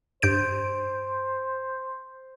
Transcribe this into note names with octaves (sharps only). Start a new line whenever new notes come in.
G2 C5 G6 D7